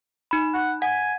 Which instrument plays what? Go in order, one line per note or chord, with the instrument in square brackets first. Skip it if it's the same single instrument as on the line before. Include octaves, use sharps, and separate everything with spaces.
[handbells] D#4 B5
[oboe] F#5
[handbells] F#5 [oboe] G#5